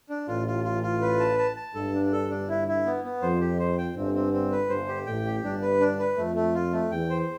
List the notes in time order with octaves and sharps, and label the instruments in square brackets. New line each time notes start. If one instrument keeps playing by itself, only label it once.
[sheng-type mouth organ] D4
[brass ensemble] A1 A2 [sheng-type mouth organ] F4
[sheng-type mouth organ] F4
F4
F4
B4
A5
A5
A5
[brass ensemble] G1 G2 [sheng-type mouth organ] A4
[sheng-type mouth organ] D4
A4
D4
E4
E4
B3
B3
[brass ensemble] F2 [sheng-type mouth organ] C5
[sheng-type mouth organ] G4
C5
G5
[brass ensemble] G1 G2 [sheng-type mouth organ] C4
[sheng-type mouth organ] C4
C4
B4
[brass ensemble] G1 G2 [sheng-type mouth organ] C5
[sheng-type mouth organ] G4
[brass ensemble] A1 A2 [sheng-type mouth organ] G5
[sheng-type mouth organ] G4
[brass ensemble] G1 G2 [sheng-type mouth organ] D4
[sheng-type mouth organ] B4
D4
B4
[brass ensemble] F2 [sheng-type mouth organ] A3
[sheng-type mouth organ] A3
F4
A3
[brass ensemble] E2 [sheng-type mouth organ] G5
[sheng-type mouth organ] C5